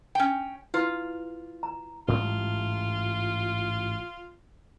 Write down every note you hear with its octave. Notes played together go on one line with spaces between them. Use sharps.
C#4 G5
E4 F4 B4
A#5
A1 G#2 G3 F4